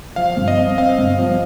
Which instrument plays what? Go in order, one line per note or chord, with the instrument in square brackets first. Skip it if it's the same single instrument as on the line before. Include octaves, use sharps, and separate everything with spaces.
[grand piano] F3 [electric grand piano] F5
[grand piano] G2
[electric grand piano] D#5
[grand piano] C4
[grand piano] C4 [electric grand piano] F5
[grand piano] G2
F3